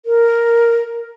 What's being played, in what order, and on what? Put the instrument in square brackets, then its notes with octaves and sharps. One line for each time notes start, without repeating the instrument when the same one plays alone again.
[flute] A#4